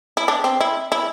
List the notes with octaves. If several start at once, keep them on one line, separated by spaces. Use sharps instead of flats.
E4
D4
C4
E4
E4